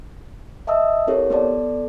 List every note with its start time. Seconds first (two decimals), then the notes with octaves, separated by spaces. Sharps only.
0.67 D#5 E5 A5 D#6 E6
1.07 C4 E4 G4 A4 A#4 C#5
1.30 B3 A4 D5 A5